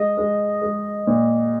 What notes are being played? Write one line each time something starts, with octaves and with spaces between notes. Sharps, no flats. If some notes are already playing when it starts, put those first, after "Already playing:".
Already playing: G#3 D#5
G#3
G#3
A#2